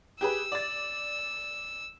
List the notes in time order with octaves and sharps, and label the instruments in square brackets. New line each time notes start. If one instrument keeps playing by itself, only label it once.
[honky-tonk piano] G4 G#4 B4 [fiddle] E6
[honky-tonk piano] D5 A6